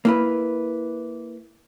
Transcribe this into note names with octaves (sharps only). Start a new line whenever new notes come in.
A#3 E4 B4